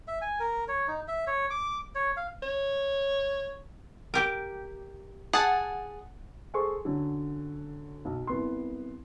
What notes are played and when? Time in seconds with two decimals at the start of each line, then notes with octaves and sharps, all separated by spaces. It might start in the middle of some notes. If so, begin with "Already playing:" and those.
0.08 E5
0.22 G#5
0.40 A#4
0.68 C#5
0.88 D#4
1.08 E5
1.27 C#5
1.50 D6
1.95 C#5
2.17 F5
2.43 C#5
4.14 G4 A#4
5.33 G#4 F#5 A5
6.54 G#4 A4 C5 C6 C#6
6.85 D3 F#3 C#4
8.05 B1
8.27 C2 B3 C6